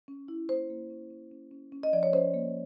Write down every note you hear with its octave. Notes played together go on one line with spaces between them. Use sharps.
C#4
E4
A#3 C5
A#3
C#4
C#4
C#4
C#4
C#4
D#5
F3 D5
C#5
C#4 C5
A#3